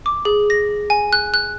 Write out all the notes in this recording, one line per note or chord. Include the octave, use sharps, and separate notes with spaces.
D6
G#4
A#6
G#5
F#6
F#6